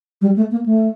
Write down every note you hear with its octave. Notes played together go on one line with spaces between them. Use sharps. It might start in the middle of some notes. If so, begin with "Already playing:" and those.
G3
A3
A#3
A3